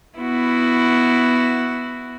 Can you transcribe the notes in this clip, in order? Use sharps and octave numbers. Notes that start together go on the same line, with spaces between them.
B3 E4 F#4